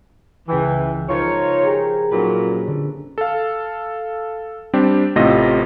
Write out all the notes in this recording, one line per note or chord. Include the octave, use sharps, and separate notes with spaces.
C#2 E3 G5
F3 D#4 F4 A#4 C5 C#5
G4 G#4 A#4
A#2 F#3 C#4 D#4 B4
D3
A4 F5
G3 C4 D4 G4
A1 A2 C3 F4 D#5 A#6